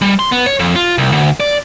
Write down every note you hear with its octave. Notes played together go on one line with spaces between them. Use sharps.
G3
C6
B3
C#5
F2
F4
C2
D2
D5